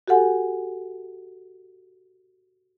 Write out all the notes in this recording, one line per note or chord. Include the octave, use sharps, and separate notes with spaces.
F#4 G4 A4 F#5 G#5